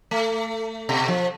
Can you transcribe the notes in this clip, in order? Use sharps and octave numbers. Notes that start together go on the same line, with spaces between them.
A3
B2
F3